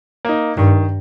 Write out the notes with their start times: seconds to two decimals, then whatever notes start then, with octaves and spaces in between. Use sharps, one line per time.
0.25 A#3 D#4
0.57 G2 D#3